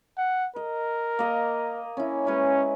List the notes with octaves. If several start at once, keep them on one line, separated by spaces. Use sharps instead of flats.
F#5
A#4 D#5
A#3 D#5
C#4 E4
G#3 C#4 B4